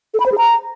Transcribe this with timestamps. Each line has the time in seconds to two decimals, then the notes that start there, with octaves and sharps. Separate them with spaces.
0.14 A4
0.20 B5
0.26 C5
0.32 G#4
0.38 A#5